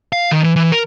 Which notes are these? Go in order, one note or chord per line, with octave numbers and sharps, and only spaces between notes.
F5
D#3
E3
E3
A#4